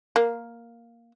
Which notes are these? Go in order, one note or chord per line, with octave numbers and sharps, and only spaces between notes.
A#3